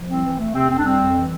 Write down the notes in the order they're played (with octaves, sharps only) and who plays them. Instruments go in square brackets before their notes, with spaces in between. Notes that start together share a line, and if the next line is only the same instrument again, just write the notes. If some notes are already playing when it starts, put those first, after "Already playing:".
Already playing: [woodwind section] F3
C2 C4
E3
A3
C3 C4
F2 C4
D4
G3 C4
F2
E3